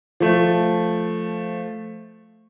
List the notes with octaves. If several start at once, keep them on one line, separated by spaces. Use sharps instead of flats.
F3 A3